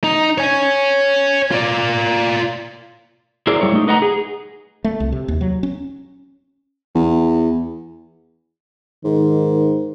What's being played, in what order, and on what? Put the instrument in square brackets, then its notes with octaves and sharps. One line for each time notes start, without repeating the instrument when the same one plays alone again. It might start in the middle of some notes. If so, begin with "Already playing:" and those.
[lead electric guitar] D#4
C#5 G#5
F4 D5
[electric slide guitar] E4 G#4 A#4 C5 D5
G3 E4 C#5
A3 D#4
D#4 B4 D#5 F#5 A5 A#5
G#4
[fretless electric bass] A3
C2
C3
D#2
F#3
C#4
[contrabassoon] E2
[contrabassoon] G#2 [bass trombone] D#3